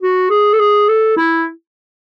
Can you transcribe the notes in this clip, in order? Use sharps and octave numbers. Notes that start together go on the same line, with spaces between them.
F#4
G#4
A4
G#4
A4
E4